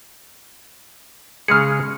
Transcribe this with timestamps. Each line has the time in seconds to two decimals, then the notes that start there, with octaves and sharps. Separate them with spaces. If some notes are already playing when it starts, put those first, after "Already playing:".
1.48 C#3 G#3 G#4 F6 C#7